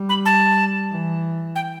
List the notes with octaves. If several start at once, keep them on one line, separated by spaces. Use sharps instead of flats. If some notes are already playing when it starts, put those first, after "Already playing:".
Already playing: G3
B5
A5
E3
G5